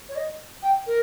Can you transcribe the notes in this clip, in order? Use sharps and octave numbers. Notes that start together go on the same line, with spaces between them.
C#5
D#5
G5
A#4